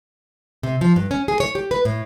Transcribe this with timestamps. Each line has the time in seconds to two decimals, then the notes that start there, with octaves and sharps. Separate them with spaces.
0.63 C3
0.81 F3
0.96 G2
1.11 C#4
1.28 G#4
1.40 C#5
1.55 G4
1.71 B4
1.85 A2